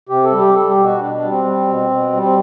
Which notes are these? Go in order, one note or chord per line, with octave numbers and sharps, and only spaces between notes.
C3 G4
A4
G3
G4
G3 A4
G4
B2
F#4
B2 D4
D4
G3
C4
G3
B2
B2
G3
C4